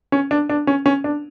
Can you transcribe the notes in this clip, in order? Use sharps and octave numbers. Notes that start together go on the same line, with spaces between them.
C#4
D4
D4
C#4
C#4
D4